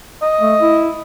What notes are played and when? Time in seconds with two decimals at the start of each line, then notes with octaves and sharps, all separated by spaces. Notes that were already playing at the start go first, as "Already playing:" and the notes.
0.22 D#5
0.41 A3
0.61 E4